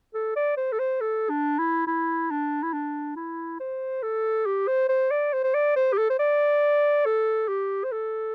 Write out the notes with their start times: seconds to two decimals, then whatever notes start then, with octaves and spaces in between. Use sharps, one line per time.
0.14 A4
0.36 D5
0.57 C5
0.72 A4
0.79 C5
1.00 A4
1.29 D4
1.58 E4
1.87 E4
2.30 D4
2.63 E4
2.73 D4
3.16 E4
3.60 C5
4.02 A4
4.46 G4
4.67 C5
4.89 C5
5.11 D5
5.33 C5
5.44 C5
5.54 D5
5.76 C5
5.93 G4
5.98 A4
6.10 C5
6.19 D5
7.06 A4
7.48 G4
7.84 C5
7.92 A4